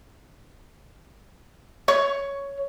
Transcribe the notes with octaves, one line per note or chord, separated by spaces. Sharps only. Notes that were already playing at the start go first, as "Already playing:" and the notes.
C#5 C#6